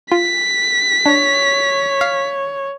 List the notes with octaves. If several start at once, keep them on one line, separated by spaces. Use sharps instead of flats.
F4 B6
D4 C#5
F5